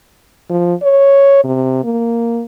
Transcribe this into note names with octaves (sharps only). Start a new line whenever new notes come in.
F3
C#5
C3
A#3